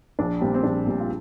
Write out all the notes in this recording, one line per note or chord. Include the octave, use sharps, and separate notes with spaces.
A#1 D4
A#2 G3 C4
C4
A#1 D4
A#2 G3
F4